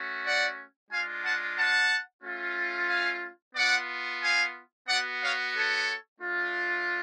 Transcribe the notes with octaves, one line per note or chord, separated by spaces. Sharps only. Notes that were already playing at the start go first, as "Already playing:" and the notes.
Already playing: A3 C#4 F#4
D5 F#5
G#3 D4 F4 F5 G#5
F#5 A5
F#5 A5
A3 C#4 F4
F5 G#5
B3 F4 D5 F#5
F5 G#5
B3 F#4 D5 F#5
C#5 F5
A4 C#5
A3 D4 F4